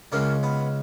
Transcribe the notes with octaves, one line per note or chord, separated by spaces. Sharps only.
C#2 C#3 G#3 A#3 C#4
B3